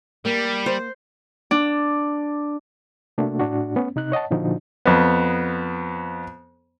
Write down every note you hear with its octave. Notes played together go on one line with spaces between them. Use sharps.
G3 A#3
C5
D4
C3 A3 A#3 D4 F#4
A2 D4 F#4
A3 B3 C#4
C3 D#4 F#6
C#5 D#5 F#5 A5
A#2 D3 F3 D4 D#4 F#4
F2 B3